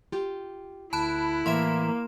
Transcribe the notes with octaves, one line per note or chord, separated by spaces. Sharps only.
F4 G4
D2 E4 A5 B5 F#6
A2 E3 A#3 E5 C6 E7